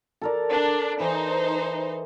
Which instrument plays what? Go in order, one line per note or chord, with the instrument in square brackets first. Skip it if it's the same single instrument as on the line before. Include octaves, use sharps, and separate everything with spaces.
[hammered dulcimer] A4 A#4 D5
[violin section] D4
[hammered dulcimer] E3 [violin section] D#4 C5